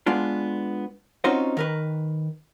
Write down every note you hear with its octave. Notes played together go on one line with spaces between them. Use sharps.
G#3 B3 D4 F4
C4 C#4 D#4 F4 F#4 C5
D#3 A#4 B4